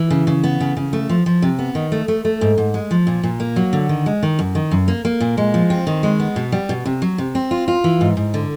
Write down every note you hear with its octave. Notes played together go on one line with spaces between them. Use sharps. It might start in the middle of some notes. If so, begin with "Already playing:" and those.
Already playing: E3
C#3
C#3
B3
C#3
C#3
A3
F3
F3
C3
B3
D#3
A3
A3
A3
G#2
G#2
G#3
F3
A#2
A#2
A#3
F#3
D3
D#3
G#3
D#3
F#2
D#3
F#2
A#3
A#3
A#2
G#3
F3
C4
D#3
G#3
B3
B2
G3
B2
C3
F#3
C3
C4
F4
F4
E3
G#2
G#2
D3